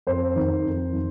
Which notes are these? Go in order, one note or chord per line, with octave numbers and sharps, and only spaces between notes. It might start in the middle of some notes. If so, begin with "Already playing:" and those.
F2 C5
D#3
F2
D#3